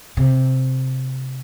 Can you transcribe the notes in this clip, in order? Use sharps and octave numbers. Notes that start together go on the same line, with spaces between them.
C3